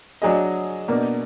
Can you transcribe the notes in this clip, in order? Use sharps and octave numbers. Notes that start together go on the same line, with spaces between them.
F#3 D4 G#4 D#5
B2 A#3 D4